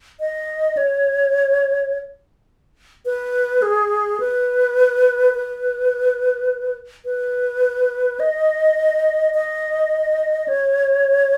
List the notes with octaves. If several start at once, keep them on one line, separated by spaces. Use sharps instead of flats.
D#5
C#5
B4
G#4
B4
B4
B4
D#5
D#5
C#5